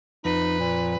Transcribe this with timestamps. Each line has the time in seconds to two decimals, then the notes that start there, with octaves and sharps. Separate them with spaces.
0.25 F2 D#4 B4
0.60 A#2